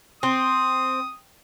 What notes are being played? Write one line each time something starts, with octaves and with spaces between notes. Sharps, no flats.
C4 D#6